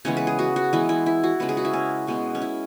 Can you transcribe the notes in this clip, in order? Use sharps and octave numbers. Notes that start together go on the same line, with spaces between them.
C#3 E3 G#3 B3 C#5
B4
G#4
F#4
F#4
E3 G#3 B3 E4
E4
E4
F#4
C#3 G#3 B3 B4
G#4
F#4
E4
C#4
B2 G#3 B3
C#4
E4